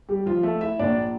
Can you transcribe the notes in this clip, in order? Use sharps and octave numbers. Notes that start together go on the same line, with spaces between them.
G3 G4
F3 F4
A3 A4
E4 E5
A#1 A#2 D4 D5